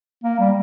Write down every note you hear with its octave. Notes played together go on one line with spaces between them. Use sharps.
A#3
G3